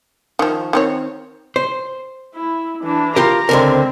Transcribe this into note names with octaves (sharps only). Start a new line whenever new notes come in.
D#3 F3
D#3 C4 C#5
C5
E4
E3 D4
F4 G4 A#4 A#5
C#2 D3 C4 A#4